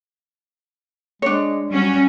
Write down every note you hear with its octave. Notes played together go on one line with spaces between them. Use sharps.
G#3 D4 C#5
F#3 G3 C#4 F#4